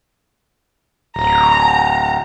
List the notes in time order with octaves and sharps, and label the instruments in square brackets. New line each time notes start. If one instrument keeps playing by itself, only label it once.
[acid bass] D1 [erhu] A#5